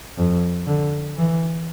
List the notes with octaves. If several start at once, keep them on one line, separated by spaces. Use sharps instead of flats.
F2
D3
E3